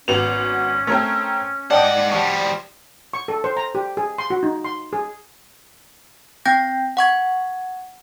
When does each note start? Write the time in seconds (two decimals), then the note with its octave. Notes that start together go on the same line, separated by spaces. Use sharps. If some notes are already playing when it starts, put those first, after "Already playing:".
0.08 G#1 B3 C#4 F#4 F7
0.87 A3 C4 A#4 C#5 F6
1.71 G#2 D5 D#5 F#5 G5 A5
2.12 F3 G3 F#5 A5 C#6
3.14 C#6
3.28 A4
3.44 C5
3.57 A#5
3.75 G4
3.97 G#4
4.18 C6
4.30 F#4
4.43 D#4
4.64 C6
4.93 G#4
6.45 C4 G5 G6 A#6
6.97 F#5 C#6 G#6